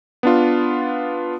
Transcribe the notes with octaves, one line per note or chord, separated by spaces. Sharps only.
B3 D4 F4